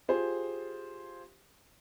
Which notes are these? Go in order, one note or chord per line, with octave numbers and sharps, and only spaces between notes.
F4 G4 G#4 C5